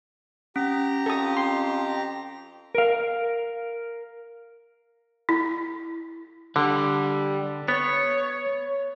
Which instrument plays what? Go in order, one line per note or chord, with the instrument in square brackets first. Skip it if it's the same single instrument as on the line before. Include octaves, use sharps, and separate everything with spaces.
[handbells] C#4 [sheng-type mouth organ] G4 A#5
[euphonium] F2 [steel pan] A4 D#6
[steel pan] C6
[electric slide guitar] A#4 F5
[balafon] E4
[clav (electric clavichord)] D3 [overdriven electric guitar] G3
[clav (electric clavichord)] B3 [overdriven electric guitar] C#5